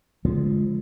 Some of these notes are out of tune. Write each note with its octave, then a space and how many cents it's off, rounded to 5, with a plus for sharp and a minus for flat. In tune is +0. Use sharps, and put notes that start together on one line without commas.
D3 -35 F3 +0 G#3 +0